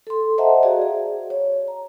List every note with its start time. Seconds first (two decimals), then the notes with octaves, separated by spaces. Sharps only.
0.07 A4 C6
0.38 C5 D#5 E5 F#5 A5 A#5
0.62 F#4 G#4 D5 F5
0.82 G#4
1.30 C#5
1.68 A#5